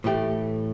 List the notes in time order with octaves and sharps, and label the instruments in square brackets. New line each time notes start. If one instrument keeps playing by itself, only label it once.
[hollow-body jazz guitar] A2 E3 A3 G4